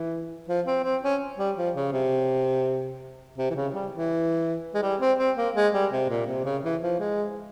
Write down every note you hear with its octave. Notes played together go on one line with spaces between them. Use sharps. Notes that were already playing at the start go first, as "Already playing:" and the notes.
Already playing: E3
F3
C4
C4
C#4
G3
F3
C#3
C3
C3
E3
C#3
G3
E3
G#3
G3
C4
C4
A#3
G#3
G3
C3
A#2
C3
C#3
E3
F3
G#3